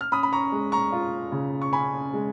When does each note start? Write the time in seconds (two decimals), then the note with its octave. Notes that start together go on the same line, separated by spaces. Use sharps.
0.01 F6
0.12 C#4 B5 D#6
0.23 B5
0.33 A#5 C#6
0.52 G#3
0.72 A#5 C#6
0.92 F4
1.32 C#3
1.62 C#6
1.72 C#4 G#5 B5
2.14 G#3